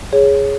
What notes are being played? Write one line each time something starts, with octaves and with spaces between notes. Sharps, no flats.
D#2 G#4 C#5